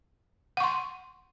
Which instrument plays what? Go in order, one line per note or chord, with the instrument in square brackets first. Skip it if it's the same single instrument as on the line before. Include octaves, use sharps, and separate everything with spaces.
[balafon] F#5
C#6
C6